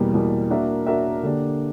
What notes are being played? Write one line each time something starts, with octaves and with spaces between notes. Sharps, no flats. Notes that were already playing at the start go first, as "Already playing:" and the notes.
Already playing: E2 B2 G3 A#3
E2 B2 G3 A#3
A#3 D4 F#4 A#4 E5
A#3 D4 F#4 A#4 E5
D3 A#3 D4 G4